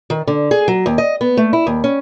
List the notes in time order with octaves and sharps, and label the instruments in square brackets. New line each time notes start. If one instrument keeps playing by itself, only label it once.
[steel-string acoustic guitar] D#3
D3
G#4
F#3
D#2
D#5
B3
A3
E4
D#2
C#4